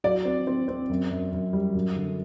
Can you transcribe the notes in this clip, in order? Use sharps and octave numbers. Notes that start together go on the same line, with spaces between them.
F#3 D5
C4
C4
C4
F#2
F#2
F#2
G3
F#2
D3